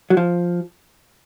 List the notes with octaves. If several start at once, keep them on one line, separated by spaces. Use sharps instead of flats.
F#3
F3